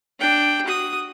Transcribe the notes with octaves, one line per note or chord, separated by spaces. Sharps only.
D4 G5
F#4 D#6